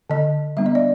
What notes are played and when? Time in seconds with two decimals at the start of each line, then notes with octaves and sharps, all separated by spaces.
0.10 D3 D#5
0.57 G3 B3 D4 E5
0.66 D#5
0.75 D5